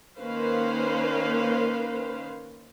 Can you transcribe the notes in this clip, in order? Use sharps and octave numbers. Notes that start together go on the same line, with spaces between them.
D#3 A#3 C#4 B4 C5 F5